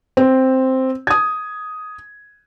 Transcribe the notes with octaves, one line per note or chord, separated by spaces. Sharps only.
C4
D#6 G#6